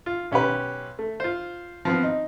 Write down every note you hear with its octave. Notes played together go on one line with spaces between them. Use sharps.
F4
B1 C#4 G4 B4
A3
F4 C5
F3 B3 C4
D#4